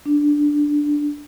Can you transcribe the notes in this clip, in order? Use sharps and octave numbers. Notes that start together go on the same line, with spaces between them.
D4